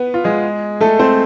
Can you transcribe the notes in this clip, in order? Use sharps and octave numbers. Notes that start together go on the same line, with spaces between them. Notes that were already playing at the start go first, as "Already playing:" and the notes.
Already playing: B3 B4
F4
G#3 G#4
A3 A4
C4 C5